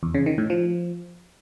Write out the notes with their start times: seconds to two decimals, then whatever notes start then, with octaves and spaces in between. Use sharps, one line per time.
0.03 E2
0.15 C#3
0.26 D#3
0.38 A2
0.50 F3